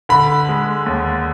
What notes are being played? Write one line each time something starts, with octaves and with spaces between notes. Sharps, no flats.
D3 B5
G#3
D#2